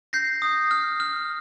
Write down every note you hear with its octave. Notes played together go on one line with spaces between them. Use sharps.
G6 A#6 C7
D#6
F6
F6